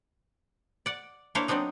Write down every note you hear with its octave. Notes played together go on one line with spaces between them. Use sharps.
D5 F#5
A#3 D4 E4 C5 C#5 F5
F#3 B3 C4 D4 D#4